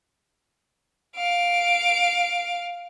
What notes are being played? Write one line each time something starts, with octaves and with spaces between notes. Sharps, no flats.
F5 D7